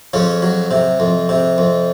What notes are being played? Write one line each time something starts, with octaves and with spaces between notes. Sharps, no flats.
F2 C#3 C#4
F#3
C3
F2
C3
F2